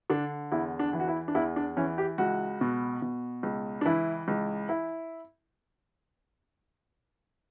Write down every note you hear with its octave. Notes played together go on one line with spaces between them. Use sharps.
D3 D4
E2 E4
D4
E3
F#4
E4
D4
E2 E4
D4
E3 C#4
G4
C#2 F#4
B2
B2
C#2
D4
E3 E4
C#2
E4